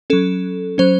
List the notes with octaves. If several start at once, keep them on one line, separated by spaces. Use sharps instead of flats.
F#3 C#4 A4
F#3 C#4 C5